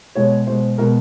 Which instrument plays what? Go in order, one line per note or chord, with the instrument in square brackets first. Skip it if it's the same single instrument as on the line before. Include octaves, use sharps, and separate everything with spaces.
[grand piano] B2 G#3 C#5
B2 G#3 C5
B2 G#3 A#4